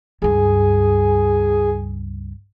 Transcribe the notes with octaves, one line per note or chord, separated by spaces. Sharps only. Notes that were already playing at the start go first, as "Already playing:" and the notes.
C#2 G2 G#4